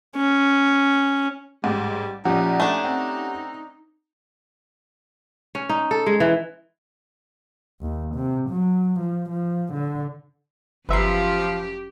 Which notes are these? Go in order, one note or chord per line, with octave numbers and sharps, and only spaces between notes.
C#4
A1 G#2 G3
A#1 F3 C#4 D#4 G4 F#5
A3 D4 G#5
C4
C#4
D#4
A4
G#3
E3
D#2
C3
F#3
F3
F3
D3
G1 F#2 F3 G4 B4 E5 A#5 C7